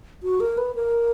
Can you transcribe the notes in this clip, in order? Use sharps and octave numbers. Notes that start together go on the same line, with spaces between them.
F#4
A#4
B4
A#4